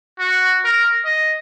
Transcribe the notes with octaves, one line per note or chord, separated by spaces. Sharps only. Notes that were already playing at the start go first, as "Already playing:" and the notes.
F#4
A#4
D#5